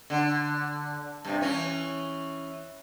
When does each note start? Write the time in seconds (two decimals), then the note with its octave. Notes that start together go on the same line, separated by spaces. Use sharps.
0.10 D3
1.25 G2 C3
1.41 E3 C#4